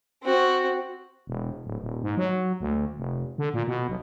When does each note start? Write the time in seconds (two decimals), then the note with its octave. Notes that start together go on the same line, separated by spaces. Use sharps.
0.23 C4 F#4
1.27 E1
1.64 D1
1.81 D#1
2.02 G#2
2.17 F#3
2.60 D2
2.97 F1
3.38 D3
3.54 A#2
3.67 B2
3.88 B1